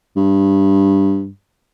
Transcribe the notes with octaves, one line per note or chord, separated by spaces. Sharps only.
G2